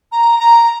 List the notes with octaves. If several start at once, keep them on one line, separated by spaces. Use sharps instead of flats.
A#5
A#5